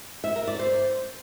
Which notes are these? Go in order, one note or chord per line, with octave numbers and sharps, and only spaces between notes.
E5
A#4
D5
C5